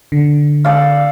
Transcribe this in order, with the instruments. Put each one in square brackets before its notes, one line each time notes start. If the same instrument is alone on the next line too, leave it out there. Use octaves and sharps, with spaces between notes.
[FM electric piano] D3
[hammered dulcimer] A4 D5 F5